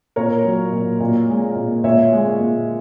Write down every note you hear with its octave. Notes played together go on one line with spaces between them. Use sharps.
A#2 A#4 C#5
F#3
A#2
A#2
G#3
A#2
A#2 C#5 E5
G#3
A#2